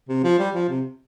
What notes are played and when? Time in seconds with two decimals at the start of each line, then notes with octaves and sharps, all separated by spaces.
0.09 C3
0.24 F3
0.39 G3
0.54 F3
0.69 C3